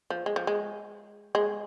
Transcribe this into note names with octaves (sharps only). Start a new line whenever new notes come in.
F3
G#3
F3
G#3
G#3